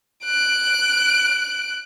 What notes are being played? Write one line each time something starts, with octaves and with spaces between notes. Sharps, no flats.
F#6 D7